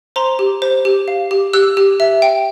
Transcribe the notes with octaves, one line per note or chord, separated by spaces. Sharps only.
C5 A#5 C6
G4
C5
G4
F5
G4
G4 E6 F#6
G4
E5
G5